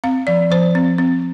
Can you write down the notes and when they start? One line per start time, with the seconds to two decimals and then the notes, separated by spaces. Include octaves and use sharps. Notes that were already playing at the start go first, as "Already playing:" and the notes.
0.04 C4 F5
0.27 F3 D5
0.50 F3 C5
0.75 C4
0.98 C4